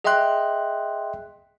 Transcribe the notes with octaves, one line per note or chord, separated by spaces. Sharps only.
G#4 D#5 E5 G5 C6 F#6